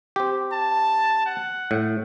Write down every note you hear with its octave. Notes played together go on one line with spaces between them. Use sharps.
C4 G4
A5
F#5
A2